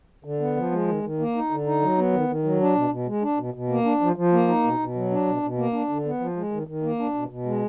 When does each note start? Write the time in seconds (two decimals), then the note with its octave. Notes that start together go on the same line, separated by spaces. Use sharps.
0.24 D3
0.40 B3
0.57 F3
0.72 G#3
0.88 D#3
1.03 D#3
1.19 A#3
1.35 D#4
1.51 D3
1.66 D#4
1.82 F#3
1.98 B3
2.13 D#3
2.28 D#3
2.44 F#3
2.60 D4
2.75 B2
2.91 B2
3.07 G#3
3.22 D4
3.38 B2
3.54 B2
3.69 A#3
3.85 D4
4.01 F3
4.16 F3
4.33 A#3
4.48 D#4
4.64 B2
4.79 B2
4.95 F#3
5.11 D4
5.26 B2
5.42 B2
5.58 A#3
5.73 D4
5.89 D3
6.05 B3
6.20 F3
6.36 G#3
6.52 D#3
6.67 D#3
6.83 A#3
6.99 D4
7.14 B2
7.30 B2
7.45 G#3